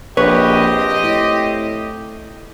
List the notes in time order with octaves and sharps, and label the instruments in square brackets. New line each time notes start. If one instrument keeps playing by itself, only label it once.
[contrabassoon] A#1 [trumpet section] C4 G4 D#5 [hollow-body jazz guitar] B4 C#5
[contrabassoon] A2